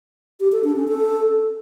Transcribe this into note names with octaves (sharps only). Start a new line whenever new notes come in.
G4
A4
D4
C#4
A4